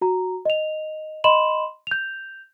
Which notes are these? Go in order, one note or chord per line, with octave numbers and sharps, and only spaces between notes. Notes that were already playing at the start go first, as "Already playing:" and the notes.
F#4 A#5
D#5 F7
D#5 B5 C6 E7 F#7
G6 F7